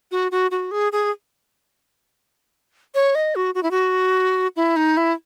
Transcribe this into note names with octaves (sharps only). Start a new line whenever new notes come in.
F#4
F#4
F#4
G#4
G#4
C#5
D#5
F#4
F#4
E4
F#4
E4
D#4
E4